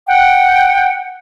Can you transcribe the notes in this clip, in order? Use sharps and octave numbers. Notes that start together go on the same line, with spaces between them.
F#5 G5